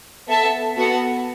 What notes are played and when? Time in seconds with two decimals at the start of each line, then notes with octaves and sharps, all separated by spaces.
0.27 B3 A4 E5 A5
0.77 B3 F#4 A4 F#5